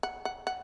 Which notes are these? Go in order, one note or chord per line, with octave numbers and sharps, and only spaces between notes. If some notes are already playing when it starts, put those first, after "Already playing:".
F#5
F#5
F#5